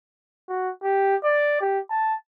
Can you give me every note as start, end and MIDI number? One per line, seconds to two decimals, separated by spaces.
0.49 0.70 66
0.83 1.16 67
1.24 1.58 74
1.61 1.79 67
1.90 2.14 81